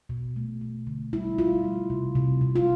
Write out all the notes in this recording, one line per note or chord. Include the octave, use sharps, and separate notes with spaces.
B2
A3
A3
D3
G3 E4
G3 F4
G3
C3
C3
C3
F4